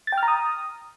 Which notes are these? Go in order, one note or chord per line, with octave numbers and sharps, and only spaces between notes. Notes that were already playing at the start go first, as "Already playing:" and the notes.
A6
G5
F6
A#5
D#6